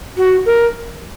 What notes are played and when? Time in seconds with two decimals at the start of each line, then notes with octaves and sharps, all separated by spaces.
0.16 F#4
0.45 A#4